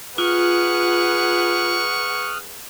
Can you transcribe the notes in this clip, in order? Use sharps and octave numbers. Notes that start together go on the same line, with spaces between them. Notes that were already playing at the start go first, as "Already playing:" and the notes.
F4 G#4 B4 F#5 C#6 D#6 F6 F#6